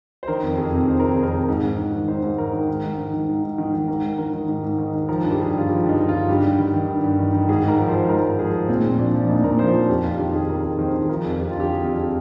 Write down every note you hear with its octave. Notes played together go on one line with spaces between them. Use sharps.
C5
D#3 A#4
F2
F2 G#4
C3
D#3 C5
F2 A#4
G#4
F2
A#4
C3
G#2
G#2
D#3
D#3
G#2 C5
G#2
D#3 A#4
D#3
G#2
G#2
D#3
D#3
G#2
G#2
D#3
D#3
G#2 A#4
G#2
D#3 A#4
D#3
G#2
G#2
D#3
D#3
F3 A#4
G2
G4
G2 G#4
D3 F4
F3 G4
G2
D#4
G2
F4
D3
G2 G4
G2
D#3
D#3
G2
G2
D#3
D#3
G#2 G#4
G#2 A#4
F3
C5
F3
G#2 A#4
G#2
F3 G#4
F3
A#2 C4
A#2
F3 D4
F3
D4
A#2 D#4
A#2 A#4
F3 C5
F3 A#4
F2 G4
F2 F4
D#3 G4
D#3 G#4
F2 A#4
F2
D#3 C5
D#3
G#4
F3 A#4
F2
F2 G4
D3 F4
G4
F3 G#4
F2
G4